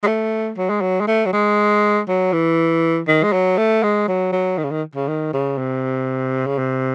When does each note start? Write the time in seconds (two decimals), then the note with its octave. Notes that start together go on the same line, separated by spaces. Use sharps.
0.03 G#3
0.07 A3
0.58 F#3
0.70 G#3
0.81 F#3
1.01 G#3
1.08 A3
1.26 F#3
1.33 G#3
2.08 F#3
2.33 E3
3.08 D#3
3.23 G#3
3.33 F#3
3.58 A3
3.83 G#3
4.08 F#3
4.32 F#3
4.58 D#3
4.64 C#3
4.71 D#3
4.95 C#3
5.08 D#3
5.33 C#3
5.58 C3
6.47 C#3
6.58 C3